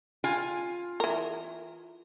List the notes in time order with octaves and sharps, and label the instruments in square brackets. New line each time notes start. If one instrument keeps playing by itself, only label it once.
[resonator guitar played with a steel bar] F4 G#5
[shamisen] E3 A#4